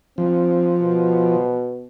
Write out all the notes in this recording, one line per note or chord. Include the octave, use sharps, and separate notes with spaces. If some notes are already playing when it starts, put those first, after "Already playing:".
F3 C4
B2